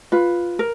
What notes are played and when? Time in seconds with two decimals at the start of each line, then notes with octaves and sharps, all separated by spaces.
0.12 F4 B4
0.59 A#4